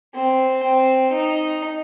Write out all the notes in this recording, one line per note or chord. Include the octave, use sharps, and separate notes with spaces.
C4
C4
D#4